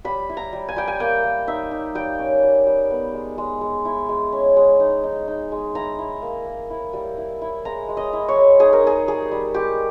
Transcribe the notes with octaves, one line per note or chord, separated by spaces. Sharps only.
G3 B5
E4
A#5
G3
G#5
G3 G5
G#5
A#3 G5
A#3
D#4 E5
D#4
G3 G5
C#4
G3
G3
B3
G#3
G#3
G#3
E4
G#3
C#4
G#3
D#4
D#4
D#4
G#3
E4 A#5
E4
A#3
A#3
E4
G3
E4
E4
G#3 A#5
G#3
D#5
E4
C#5
G#3
D#4 G#4
A#4
D#4 G#4
G3 G#4
G3
G#3 G4